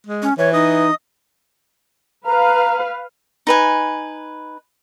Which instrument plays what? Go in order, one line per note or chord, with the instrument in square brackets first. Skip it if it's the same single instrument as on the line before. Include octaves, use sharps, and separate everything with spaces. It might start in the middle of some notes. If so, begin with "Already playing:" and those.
[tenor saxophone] G#3
[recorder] C#4
[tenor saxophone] E3 [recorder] C#5
[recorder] D#4 [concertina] D#5 D#6
[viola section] B4 F5 [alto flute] A#5
[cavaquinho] D#4 B4 G#5